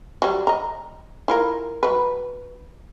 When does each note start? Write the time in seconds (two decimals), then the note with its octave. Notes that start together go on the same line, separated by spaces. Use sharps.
0.22 F#3 G3
0.47 D#5 A#5
1.28 E4 F4 A#4
1.83 F#3 B4